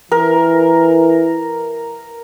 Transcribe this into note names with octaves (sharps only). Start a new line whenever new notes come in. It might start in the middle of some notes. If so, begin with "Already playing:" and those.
E3 A#4